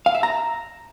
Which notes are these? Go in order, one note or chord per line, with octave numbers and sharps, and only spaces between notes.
F5
E5
A#5